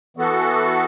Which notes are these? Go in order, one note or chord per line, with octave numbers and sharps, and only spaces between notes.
E3 B3 F#4 A4